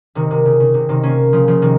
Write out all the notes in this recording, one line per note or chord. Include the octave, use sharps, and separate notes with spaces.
C3 D#3
C3
C#3
C#3
C3
C3 D#3
A#3 C#4
C#3 F3
C#3 F3
C3 D#3